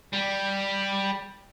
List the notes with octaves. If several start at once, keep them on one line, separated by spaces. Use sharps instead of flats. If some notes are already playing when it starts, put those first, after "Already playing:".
G3